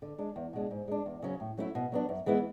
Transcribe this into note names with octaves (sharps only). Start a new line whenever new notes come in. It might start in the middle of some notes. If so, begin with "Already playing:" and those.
D3
G#3 D4
E2
B2 G#3 D4
G#2
G#3 D4
E2
C#3 F#3 C#4
A2
F#3 A3 C#4 E4
B2
F#3 B3 D4
F#2
E3 G#3 B3 E4